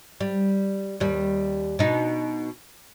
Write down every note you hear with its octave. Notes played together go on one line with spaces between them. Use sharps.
G3
D#2 G3
B2 D#4